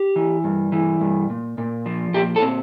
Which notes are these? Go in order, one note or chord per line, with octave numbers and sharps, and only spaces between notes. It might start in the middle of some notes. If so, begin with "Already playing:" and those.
Already playing: G4
E3
G2
E3
G2
A#2
A#2
F3
A#2 G4
A4
C4